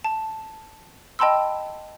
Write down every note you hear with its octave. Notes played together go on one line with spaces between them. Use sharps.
A5
D#5 G5 A5 B5 C6 E6